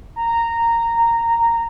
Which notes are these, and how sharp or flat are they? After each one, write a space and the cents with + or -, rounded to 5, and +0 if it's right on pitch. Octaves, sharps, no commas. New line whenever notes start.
A#5 -10